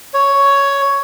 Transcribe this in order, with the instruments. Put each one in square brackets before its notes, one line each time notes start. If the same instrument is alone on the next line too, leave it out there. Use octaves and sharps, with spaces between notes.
[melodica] C#5